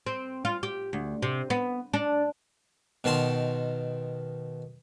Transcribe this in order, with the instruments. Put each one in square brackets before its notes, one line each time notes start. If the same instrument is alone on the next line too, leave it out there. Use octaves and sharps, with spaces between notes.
[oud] C4
F4
G4
D2
C3
B3
D4
[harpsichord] B2 D#3 A5 C6